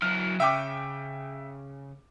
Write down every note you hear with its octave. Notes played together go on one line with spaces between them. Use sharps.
F#3 E4 F6
C#3 E5 G5 D6